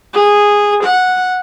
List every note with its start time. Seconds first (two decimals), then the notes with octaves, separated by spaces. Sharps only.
0.13 G#4
0.84 F#5